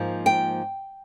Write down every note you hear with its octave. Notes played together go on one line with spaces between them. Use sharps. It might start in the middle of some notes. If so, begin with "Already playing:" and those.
Already playing: G#2 F3 A#3
G5